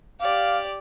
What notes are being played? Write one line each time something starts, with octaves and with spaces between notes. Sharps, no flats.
G4 D5 F5